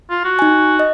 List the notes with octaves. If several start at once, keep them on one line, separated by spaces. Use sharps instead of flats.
F4
F#4
D#4 G#5
D#5